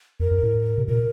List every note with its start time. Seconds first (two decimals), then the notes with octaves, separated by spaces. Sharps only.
0.20 F2 A#4
0.31 F#2
0.43 A2
0.78 C3
0.88 A#2 A#4